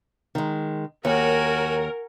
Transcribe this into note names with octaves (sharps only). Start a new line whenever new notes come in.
D#3 G#3
D#2 F#4 A#4 C#5 G#5